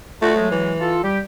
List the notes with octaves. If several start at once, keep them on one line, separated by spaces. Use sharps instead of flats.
A3 D4 F4 F#4
F#3 G#3
E3
F4 A4
G3 G4